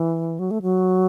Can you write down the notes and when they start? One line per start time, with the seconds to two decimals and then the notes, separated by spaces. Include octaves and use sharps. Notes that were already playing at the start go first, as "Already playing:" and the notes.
Already playing: E3
0.39 F#3
0.51 A3
0.62 F#3